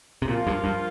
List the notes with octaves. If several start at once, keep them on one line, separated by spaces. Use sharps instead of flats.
C3
A#2 F3 A#3 F4
G2
G2